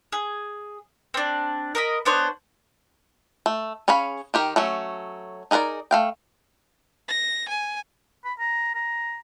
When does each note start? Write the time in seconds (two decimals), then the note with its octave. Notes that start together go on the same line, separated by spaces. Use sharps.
0.12 G#4
1.14 C4 D4
1.75 A#4 D#5 B5
2.05 B3 D4 C5 C#5
3.46 A3
3.88 C#4 G#4 C#5 F5 B5
4.34 D#3 G4 A#4
4.56 F#3 A3 C#4
5.51 D#4 G#4 A#4 B4 D5
5.91 A3 F5 G5
7.08 A#6
7.49 G#5
8.25 B5
8.39 A#5
8.75 A#5